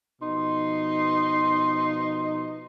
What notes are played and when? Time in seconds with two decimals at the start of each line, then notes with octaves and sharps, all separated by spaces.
0.21 B2 F3 D#4 C6